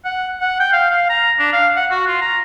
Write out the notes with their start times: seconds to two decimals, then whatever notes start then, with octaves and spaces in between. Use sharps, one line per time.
0.05 F#5
0.41 F#5
0.60 G5
0.73 F5
0.91 F5
1.09 A#5
1.39 D4
1.53 F5
1.76 F#5
1.91 F#4
2.07 F4
2.21 A#5